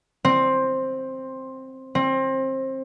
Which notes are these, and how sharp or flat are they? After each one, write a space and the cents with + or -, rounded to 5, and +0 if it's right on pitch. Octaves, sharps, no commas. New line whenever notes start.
C4 +10
C4 +25